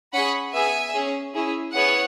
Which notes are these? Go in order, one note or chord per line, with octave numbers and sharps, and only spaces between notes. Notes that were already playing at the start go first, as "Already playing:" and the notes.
C#4 G#4 F#5 B5
B3 G#4 E5 G#5
C#4 G#4
C#4 E4 G#4
B3 E4 G#4 C#5 F#5